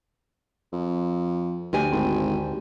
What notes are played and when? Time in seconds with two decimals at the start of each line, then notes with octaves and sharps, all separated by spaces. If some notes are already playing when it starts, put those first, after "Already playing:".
0.72 F2
1.73 D2 G4 G#5
1.92 G#1